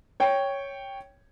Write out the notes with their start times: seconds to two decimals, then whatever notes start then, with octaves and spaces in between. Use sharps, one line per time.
0.20 C#5 G5